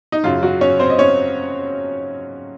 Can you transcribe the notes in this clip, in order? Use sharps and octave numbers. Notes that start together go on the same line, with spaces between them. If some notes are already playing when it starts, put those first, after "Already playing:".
D#4
F#2 C#3 F#3 F4
F#3 F#4
C#4 C#5
C4 C5
D#5
C#4 C#5